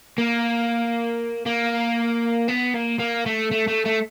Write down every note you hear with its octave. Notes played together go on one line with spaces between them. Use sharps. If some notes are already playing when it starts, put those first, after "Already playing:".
A#3
A#3
B3
A#3
A#3
A3
A3
A3
A3